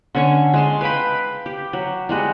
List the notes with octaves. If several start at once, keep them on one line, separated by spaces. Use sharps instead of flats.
D3 C#4 C#6
G#3 A5 C6
B4 F5 G5 B5
G4
F#3
G3 G#3 F#4